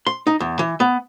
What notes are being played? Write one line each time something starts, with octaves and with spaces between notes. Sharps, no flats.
C6
D#4
E2
E3
B3